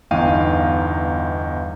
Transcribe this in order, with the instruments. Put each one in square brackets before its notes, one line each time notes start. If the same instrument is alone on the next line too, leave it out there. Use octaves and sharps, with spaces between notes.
[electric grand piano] G1 E2 D#4 F5 G5 D#7